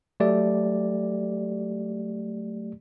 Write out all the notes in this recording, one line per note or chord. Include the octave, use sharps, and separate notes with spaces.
F#3 A3 G4 D5